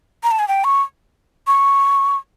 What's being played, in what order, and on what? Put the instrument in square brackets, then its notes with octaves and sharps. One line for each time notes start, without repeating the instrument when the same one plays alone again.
[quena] A#5
A5
G#5
G5
C#6
C#6